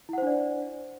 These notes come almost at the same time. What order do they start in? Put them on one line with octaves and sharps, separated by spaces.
E4 F#5 C5 D4 D5